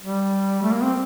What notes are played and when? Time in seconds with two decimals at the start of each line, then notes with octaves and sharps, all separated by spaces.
0.03 G3
0.63 A3
0.72 A#3
0.83 C4